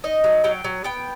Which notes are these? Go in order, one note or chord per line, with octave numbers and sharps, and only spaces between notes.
D#4 D#5
F#3
F#3 G5
F#3
B3 G5